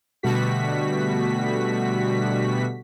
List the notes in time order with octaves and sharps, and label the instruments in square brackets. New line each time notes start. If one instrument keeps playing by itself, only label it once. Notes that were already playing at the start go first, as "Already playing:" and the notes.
[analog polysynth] B2 D3 G3 A3 F#4 B6